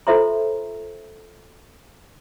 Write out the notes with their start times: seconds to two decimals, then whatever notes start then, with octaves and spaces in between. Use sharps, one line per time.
0.07 F4 A4 C5 E5 A#5 C6